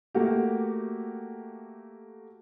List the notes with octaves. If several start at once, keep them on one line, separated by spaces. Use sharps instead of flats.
A3 A#3 F#4 G4